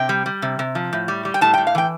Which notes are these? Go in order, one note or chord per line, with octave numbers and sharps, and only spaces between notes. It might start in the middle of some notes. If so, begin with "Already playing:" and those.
Already playing: C3 G5
G3
G3
C3
C3
F3
A2
G3
G3
G5
A2 A5
G5
A2
F5
E3 G5